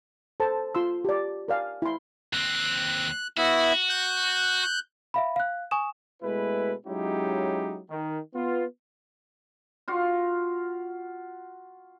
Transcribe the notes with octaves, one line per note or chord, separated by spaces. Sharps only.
A4 C5 A5
F4 C6 E6
G4 D5
A#4 D5 F5 G#5
E4 C6
D#2 C4 F#6
B3 E4 F#4 E5
F#6 G6
E5 F5 B5
F5 F#6
G#5 C#6 D#6 E7
B2 G#3 A3 E4 B4
F#3 G#3 C#4 D#4 E4 G4
D#3
B3 F4
F4 F#4 F5